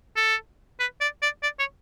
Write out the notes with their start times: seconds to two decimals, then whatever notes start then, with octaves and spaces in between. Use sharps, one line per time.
0.16 A4
0.80 B4
1.01 D5
1.22 D5
1.43 D5
1.59 C#5